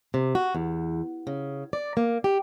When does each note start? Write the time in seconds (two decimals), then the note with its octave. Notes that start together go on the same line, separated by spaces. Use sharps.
0.14 C3
0.35 F#4
0.55 E2
1.27 C#3
1.73 D5
1.97 A#3
2.24 G4